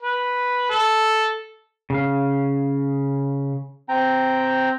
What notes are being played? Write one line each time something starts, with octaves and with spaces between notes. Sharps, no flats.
B4
A4
C#3 F5
C4 G5 A#5